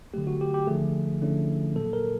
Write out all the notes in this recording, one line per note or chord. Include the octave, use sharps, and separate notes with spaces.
D3 F#3 A3 G4
F#4
G4
G4
D3 F3 A3 G#4
D3 F3 A3 C#4 E4
A#2 F#3 A#3 A4
A#4